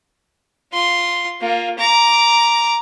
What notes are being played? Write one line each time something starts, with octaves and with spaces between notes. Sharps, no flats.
F4 C6
A#3 F4
A#5 D6